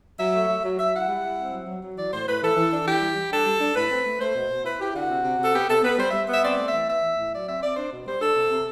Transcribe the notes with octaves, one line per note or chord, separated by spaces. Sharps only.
F#3 E5
A3
F#3
F#3
F#3 E5
E4 F#5
G3
E4
C4
F#3
F#3
F#3
E3 D5
A2 C5
A2 B4
E3 A4
E3
D4
E3 G4
G3
G3
D4 A4
G3
D4
A2 B4
C4
A3
A3 C5
B2
B2
E4 B4
E4 G4
D3 F#4
C3
C3
C3 A4
B3 G4
C3 A4
B3 B4
G3 C5
G3 E5
B3 E5
C4 D5
A3
E5
E3
B3 E5
E3
A2
F#3 D5
C4 E5
C4 D5
D4 C5
B2
G3 C5
D4 A4
C3
C3